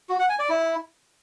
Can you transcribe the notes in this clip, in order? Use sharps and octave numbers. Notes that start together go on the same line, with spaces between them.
F#4
F#5
G#5
D5
E4